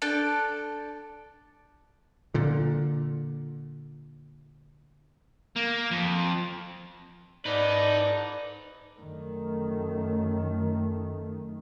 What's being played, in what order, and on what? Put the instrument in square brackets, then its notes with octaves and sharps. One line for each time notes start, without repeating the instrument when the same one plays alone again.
[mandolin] D4 A4 G5 A5
[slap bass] A#2 D3
[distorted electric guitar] A#3
F2
[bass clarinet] G#2 [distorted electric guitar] D#4 [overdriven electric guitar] A4 B4 [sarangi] D5
[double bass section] F#2 D#3 A3